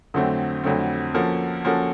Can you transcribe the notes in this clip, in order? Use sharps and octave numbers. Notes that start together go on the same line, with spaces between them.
F2 D3 F#3 A3 C4
F2 D3 F#3 A3 C4
F3 A#3 C#4 F#4 A4
F3 A#3 C#4 F#4 A4